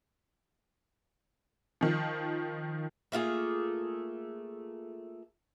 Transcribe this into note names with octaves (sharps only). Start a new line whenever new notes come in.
D#3 F3
A3 A#3 F4 G#4